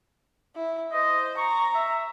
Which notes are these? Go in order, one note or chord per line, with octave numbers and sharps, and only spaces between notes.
E4
C5 D#5
A#5 C#6
E5